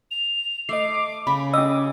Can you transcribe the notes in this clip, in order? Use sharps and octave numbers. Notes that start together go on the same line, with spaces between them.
F7
A3 D#5 D6 C7
C#3 B5
C#4 D#5 D6 E6